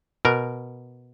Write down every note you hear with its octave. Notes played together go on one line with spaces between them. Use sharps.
B2 A#4